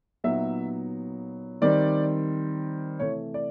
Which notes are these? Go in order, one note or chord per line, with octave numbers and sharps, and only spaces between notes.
A#2 F#3 B3 D#4 E5
D#3 G3 C4 D5
C3 E3 A3 C#5
D5